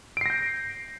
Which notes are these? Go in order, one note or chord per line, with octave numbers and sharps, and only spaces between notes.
G6 A#6 C7 D7